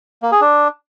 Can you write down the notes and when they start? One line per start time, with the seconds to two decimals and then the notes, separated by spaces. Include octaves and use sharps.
0.22 A#3
0.32 G#4
0.41 D4